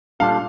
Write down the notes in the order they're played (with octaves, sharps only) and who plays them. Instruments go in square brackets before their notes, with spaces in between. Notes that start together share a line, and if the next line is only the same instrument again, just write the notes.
[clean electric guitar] A#2 G3 D4 F4 A4 [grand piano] F5